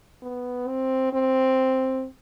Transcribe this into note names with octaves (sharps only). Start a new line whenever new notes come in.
B3
C4
C4